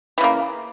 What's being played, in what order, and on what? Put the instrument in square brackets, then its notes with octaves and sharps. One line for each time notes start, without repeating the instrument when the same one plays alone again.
[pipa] E3
C#3
A#3